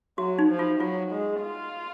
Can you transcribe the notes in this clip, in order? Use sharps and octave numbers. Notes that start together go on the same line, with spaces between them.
F#3 F#4
D#4
F3
F4
F#3 F4
G#3
F4